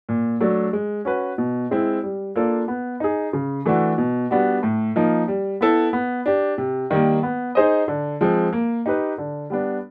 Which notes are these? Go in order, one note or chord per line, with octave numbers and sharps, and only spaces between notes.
A#2
F#3 A3 D4
G#3
C#4 F#4 B4
B2
G#3 C4 E4
G3
A#3 D4 F4 A4
B3
D#4 G#4
C#3
E3 A3 D4 F#4
B2
G3 B3 D4 F#4
A2
F3 A#3 D#4
G3
B3 E4 A4
B3
D4 G4
C3
D#3 G3 A#3
B3
D#4 G#4 C5 D#5
D3
F3 G#3 C4
A#3
D#4 G4 B4
D3
G3 B3 D4